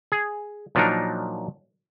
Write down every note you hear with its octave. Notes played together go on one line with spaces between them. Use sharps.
G#4
A#2 F3 F#3 D4 D#4 A#4